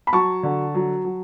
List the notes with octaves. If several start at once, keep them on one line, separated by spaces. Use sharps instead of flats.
B5
F#3 A5 C#6
D3
F#3
F#3